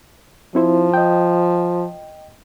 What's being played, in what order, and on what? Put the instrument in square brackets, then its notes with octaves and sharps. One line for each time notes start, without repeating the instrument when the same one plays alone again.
[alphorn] F3 [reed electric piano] C4 E4 C5
[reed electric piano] D#5 G5